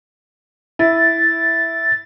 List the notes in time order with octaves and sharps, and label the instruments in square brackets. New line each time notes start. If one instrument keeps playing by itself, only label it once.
[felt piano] E4 [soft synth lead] A6